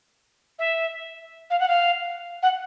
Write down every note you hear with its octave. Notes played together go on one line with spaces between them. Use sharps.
E5
F5
F#5
F5
F#5